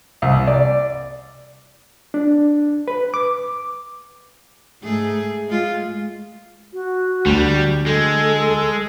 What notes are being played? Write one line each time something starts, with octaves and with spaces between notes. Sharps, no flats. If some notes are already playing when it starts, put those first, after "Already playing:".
C2
D5
D4
B4
D6
G#2 A3 G#4
G#3 F4
F#4
D2 G3
G#3 A4